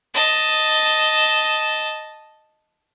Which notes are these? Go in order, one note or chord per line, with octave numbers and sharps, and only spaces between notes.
D#5 A5